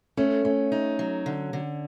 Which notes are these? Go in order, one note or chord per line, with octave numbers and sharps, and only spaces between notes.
A3 C#4
A3 C#4
D#4
F#3
D3
D3